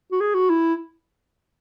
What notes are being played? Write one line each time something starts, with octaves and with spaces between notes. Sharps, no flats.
F#4
G#4
F#4
E4